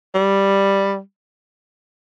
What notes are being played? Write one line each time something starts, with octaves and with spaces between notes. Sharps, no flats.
G3